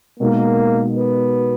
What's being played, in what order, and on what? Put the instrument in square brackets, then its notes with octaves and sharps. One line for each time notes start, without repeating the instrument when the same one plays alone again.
[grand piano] B2 G#3 D#4 A#4 [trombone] A#3
[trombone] B3